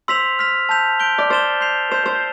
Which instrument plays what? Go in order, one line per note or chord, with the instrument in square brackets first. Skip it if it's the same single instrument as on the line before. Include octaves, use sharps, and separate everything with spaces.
[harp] C5 [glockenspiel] C6 E6 B6 F7
[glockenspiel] F6 B6 F7
A5 E6 G6 B6 F7
G6 D7 G7
[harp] D5
[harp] C5 [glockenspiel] F6 A6 E7 G7
[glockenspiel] C6 G6 C7 F7
[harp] C5 [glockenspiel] G6 C7 E7
[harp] C5